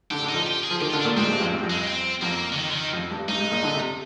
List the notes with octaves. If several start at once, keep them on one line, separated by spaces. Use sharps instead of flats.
D3 G4
D3
D#4
F3
G4
G#4
F3
D#3 G4
F4
D3
D4
A#2
G#2 C4
G2
F2
G2
F2
G#3
C4
F2 A#3
D3
D#3
D3
D#3
F2
G2
G2 D#4
G#2
A#2
D3
C3